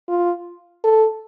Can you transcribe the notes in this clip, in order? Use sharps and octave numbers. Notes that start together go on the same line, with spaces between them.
F4
A4